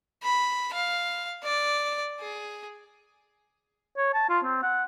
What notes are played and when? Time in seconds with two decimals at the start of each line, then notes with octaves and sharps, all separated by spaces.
0.23 B5
0.73 F5
1.43 D5
2.20 G#4
3.97 C#5
4.14 A5
4.29 F4
4.44 C4
4.63 F#5